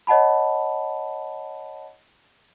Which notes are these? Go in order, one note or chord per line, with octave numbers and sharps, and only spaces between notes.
C#5 D#5 F#5 A5 B5